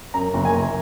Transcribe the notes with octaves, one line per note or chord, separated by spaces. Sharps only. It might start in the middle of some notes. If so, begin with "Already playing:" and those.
F#2 A#5
F#1
G#5
F#1